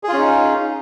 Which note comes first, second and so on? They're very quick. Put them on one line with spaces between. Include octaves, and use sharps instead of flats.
G#4 F4 C#4 D#4